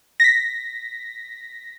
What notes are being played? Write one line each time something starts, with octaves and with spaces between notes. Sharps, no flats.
A#6 B6